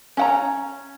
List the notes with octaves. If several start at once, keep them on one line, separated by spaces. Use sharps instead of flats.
C#4 F#5 A#5